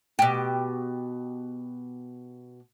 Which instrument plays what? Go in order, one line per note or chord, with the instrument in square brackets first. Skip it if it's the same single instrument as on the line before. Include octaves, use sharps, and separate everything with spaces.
[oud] B2 G4